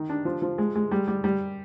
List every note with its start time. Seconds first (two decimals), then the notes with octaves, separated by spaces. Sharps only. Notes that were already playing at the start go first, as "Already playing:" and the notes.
Already playing: D#3
0.09 D4
0.25 F3
0.42 F3
0.58 G#3
0.75 G#3
0.91 G3
1.08 G3
1.24 G3